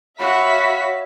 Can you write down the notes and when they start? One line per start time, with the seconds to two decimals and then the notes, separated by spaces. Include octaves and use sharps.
0.20 F#4 C#5 E5 F5 B5 B6